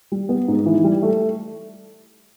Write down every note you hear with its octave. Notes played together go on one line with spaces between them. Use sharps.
G3
B3
G#2
E3
G3
A3